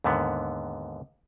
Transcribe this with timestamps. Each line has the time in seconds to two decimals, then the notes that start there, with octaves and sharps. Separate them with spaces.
0.04 D#2 G#2 D3 B3